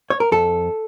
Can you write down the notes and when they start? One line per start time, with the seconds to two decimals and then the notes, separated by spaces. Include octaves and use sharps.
0.10 C#5
0.20 A#4
0.32 F2 A4